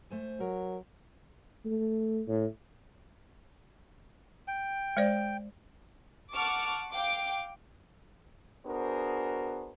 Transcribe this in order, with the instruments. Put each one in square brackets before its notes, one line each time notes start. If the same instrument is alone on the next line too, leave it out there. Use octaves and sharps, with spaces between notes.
[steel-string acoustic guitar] A3 C5 G#5
[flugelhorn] F#3 [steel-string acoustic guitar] A#4
[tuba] A3
A2
[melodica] G5
[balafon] G#3 C5 D5
[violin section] F#5 A5 C#6 D6 F6
F5 G5 D6
[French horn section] B3 D4 F#4 G#4 A#4 C5